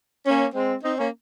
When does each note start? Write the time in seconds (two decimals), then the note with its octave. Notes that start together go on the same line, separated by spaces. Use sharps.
0.25 A#3 C#4
0.53 G#3 C4
0.83 C4 D#4
0.97 A#3 C#4